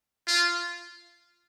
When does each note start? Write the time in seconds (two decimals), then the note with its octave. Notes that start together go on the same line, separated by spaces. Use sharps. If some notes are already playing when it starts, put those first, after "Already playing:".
0.27 F4